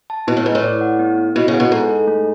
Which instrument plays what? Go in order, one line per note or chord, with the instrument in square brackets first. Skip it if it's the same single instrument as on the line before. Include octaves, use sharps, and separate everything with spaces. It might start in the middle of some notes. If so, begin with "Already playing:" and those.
[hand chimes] A5
[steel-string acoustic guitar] B2 [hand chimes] E4
[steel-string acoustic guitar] A2
[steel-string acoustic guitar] G#2 [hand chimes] B4
[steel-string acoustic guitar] A2
[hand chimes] D5
F#5
B3
B3
[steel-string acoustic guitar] B2 [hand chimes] E4
[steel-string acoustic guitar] C#3
[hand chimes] F#5
[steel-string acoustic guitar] B2
[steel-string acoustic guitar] G#2 [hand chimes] A4
[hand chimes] A4
A3